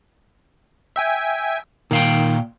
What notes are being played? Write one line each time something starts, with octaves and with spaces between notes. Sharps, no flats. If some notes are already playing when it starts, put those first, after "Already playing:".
E5 G5 G#5
A#2 D#3 F5 G5